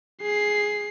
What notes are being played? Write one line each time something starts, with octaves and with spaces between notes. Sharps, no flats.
G#4 C7